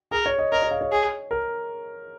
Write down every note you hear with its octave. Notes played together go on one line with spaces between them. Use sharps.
G#4 A#4
C#5
D#5
A#4 D#5
C#5
F5
C#5
G#4
A#4